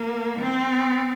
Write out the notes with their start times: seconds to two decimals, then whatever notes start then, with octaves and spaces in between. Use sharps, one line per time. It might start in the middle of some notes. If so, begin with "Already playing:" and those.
Already playing: A#3
0.39 C4